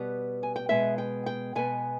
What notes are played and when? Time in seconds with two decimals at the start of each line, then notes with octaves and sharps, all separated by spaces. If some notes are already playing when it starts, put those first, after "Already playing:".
Already playing: B2 G3 B3
0.43 G#5
0.56 G5
0.69 B2 G#3 B3 E5
0.98 G5
1.26 G5
1.55 B2 G#3 B3 G#5